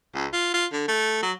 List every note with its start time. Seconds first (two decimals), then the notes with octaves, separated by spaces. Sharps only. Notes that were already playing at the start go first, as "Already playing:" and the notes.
0.15 C#2
0.33 F4
0.53 F4
0.72 D3
0.88 A3
1.22 F#3